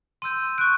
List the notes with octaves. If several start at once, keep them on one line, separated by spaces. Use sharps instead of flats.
C6 E6 G6 D#7
C#6 F#6 D7